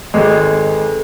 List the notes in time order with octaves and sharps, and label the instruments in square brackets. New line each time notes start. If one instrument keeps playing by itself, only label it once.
[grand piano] G#1 G#3 [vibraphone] G#4 A4 B4